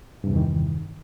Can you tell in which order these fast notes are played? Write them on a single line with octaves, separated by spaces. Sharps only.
G2 C3 E2 E3 D#3